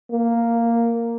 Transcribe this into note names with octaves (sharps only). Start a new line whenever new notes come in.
A#3